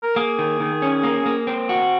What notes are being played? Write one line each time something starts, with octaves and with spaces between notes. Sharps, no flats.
A#4
A#3 G#4
D#3
D#3
C#4
A#3
A#3
C4
F#4